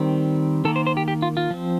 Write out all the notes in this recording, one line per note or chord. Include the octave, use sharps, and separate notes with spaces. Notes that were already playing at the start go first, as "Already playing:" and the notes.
Already playing: D#3 G3 C4
D#3 A#3 A4
C5
C5
G4
G4
F4
F4
F3 C4